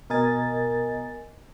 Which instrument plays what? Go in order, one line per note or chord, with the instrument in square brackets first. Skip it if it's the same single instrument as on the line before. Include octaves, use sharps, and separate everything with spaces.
[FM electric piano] B2 A#4 D#5 G#5 A6